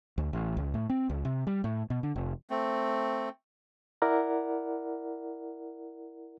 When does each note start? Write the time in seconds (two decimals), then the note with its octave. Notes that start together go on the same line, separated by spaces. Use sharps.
0.18 D2
0.33 A1
0.57 C#2
0.74 A2
0.89 C4
1.10 C#2
1.25 C3
1.47 G3
1.64 A2
1.90 B2
2.03 D3
2.16 F1
2.50 A3 C4
4.02 E4 A#4 D5 F#5